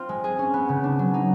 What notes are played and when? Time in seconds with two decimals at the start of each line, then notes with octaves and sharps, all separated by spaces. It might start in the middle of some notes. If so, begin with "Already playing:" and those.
Already playing: C4 F4
0.09 G#3
0.24 G#4
0.39 C#4
0.54 B3
0.69 C#3
0.84 D4
0.99 F#3
1.14 D#4